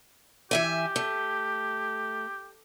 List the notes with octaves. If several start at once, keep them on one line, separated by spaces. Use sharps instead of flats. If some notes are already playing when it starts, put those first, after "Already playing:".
E3 G4 E5 G#5
A3